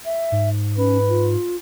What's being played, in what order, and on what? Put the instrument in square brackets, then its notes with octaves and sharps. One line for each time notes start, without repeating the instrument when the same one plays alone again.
[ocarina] E5
[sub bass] G#2
[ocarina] C#4 [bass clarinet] B4
[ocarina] F4